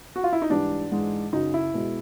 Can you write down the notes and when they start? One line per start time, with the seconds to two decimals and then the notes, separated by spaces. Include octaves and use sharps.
0.16 F#4
0.24 F4
0.33 E4
0.42 D#4
0.50 G#2 E3 G3 D4
0.91 G#2 E3 G#3
1.33 F#2 C#3 F#3 D#4
1.54 E4
1.74 B2 G#3